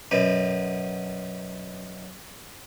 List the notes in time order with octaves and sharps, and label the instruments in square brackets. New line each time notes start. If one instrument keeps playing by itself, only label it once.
[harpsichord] F#2 B2